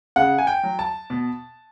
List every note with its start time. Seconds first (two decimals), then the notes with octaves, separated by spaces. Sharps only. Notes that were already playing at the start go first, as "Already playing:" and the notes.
0.16 C#3 F#5
0.38 G#5
0.47 G5
0.63 F#3
0.79 A5
1.10 B2